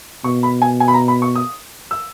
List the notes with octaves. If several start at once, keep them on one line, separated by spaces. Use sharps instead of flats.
B2 C#6
B5
G#5
G#5
B5
A#5
B5
C#6
D#6
E6